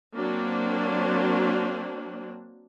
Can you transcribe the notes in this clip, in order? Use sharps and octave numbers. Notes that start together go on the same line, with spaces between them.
F#3 A#3 C4 D4